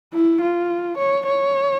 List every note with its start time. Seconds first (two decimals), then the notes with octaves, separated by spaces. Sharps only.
0.14 E4
0.41 F4
0.98 C#5
1.27 C#5